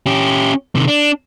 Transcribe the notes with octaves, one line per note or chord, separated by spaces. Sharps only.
C#4 G4
C3 D#3
D4